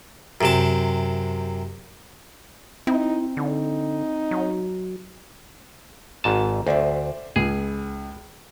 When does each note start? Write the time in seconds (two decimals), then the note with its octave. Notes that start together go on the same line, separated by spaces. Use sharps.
0.41 F#2 C3 A5
2.87 C4 D#4 E4
3.37 D3 D#4
4.31 F#3
6.24 G#1 G#2 A5
6.67 D2 C5 D5 E5
7.36 C#2 G#4